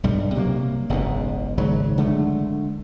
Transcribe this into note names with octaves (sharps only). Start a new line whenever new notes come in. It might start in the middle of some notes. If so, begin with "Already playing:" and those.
B1 G2 G3
C3 F#3 G#3 A#3
F#1 B1 G#2 B2
G#1 C#3 F#3
D3 G#3 A3